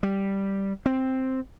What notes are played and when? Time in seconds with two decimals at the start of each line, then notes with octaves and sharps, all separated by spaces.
0.03 G3
0.86 C4